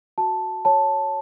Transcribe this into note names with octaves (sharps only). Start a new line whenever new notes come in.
F#4 A5
C#5 A5